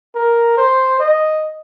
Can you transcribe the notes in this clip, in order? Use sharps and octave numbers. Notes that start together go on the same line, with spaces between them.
A#4
C5
D#5